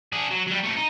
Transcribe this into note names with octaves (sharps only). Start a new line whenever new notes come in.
D4 G#4
F#3
F#3 G3
C3 A3
D#4